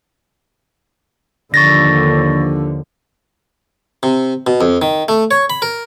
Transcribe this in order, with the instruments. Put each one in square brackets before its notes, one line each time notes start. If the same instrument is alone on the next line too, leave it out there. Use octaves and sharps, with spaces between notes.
[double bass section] D#2 D3 F3 [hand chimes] C#6 A6 A#6
[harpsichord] C3
B2
F2
D#3
A3
C#5
B5
A#4